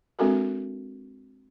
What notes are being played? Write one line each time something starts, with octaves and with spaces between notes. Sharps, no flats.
G#3 C4 D4 F#4 A4 A#4